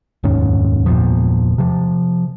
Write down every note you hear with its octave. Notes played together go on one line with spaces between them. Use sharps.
F1 D#2 G#2 C#4
G1 E2 A#2 F3
C3 F3